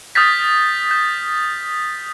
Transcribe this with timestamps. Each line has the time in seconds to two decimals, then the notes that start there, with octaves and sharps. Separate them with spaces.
0.15 D#6 F6 G6 A6 B6
0.91 G6